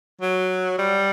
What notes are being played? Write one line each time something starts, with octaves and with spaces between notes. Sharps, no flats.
F#3
G3